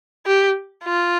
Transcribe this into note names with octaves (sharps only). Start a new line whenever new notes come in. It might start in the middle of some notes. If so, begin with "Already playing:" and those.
G4
F4